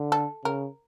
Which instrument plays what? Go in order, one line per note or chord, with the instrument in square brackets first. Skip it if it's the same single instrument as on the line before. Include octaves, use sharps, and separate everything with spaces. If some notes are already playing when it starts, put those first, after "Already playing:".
Already playing: [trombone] D3
[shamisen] A4
[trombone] C#3 [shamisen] A#4